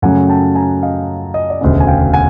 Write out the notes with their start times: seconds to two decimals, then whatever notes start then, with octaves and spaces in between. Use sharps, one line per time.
0.02 F#2 C#3 F#3 A3 F#5 G#5
0.28 G5 A5
0.55 G#5 A#5
0.82 D#5 F5
1.34 D#5
1.50 D5
1.61 E1 D2 C#3 D#5
1.80 G#5
1.87 F5 G5
2.13 F#5 G#5